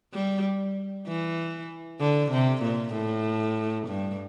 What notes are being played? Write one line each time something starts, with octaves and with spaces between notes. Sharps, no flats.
G3
E3
D3
C3
A#2
A2
G2